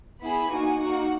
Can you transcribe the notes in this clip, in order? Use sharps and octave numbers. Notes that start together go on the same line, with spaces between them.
B3 E4 G#4 B5
A#3 D#4 F#4 G#5
A#3 D#4 F#4 F#5